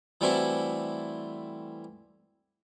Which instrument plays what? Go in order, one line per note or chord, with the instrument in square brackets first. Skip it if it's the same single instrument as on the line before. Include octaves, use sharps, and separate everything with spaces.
[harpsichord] E3 G3 A3 C4 E4 F#4